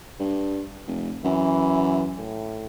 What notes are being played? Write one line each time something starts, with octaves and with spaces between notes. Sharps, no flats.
G2
F1
F#2 E3
A2